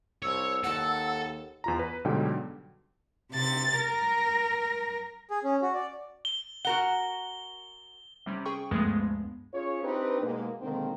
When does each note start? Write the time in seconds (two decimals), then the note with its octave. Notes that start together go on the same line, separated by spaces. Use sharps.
0.23 C2 C#5 E6
0.64 D#2 A4 F#5
1.64 E2 F4 A#5
1.79 B4
2.05 G#2 B2 D3 F#3 G3 G5
3.32 C3 A6
3.77 A#4
5.31 G#4
5.44 C#4
5.62 F#4
5.74 D5
6.25 G7
6.65 F#4 A#4 F#5 G7
8.26 C3 G3 C#4
8.45 G#4 G5 C#6
8.71 D2 G2 F3 G#3 A3 B3
9.54 C#4 F4 G#4 C#5
9.83 C4 D4 D#4 G4 B4
10.22 G#2 B2 G#3 A#3
10.62 B2 D3 D#3 G#3 A#3 C4